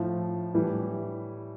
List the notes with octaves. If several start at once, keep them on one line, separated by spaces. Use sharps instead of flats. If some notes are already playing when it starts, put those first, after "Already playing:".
Already playing: A2 F3
A2 E3 G3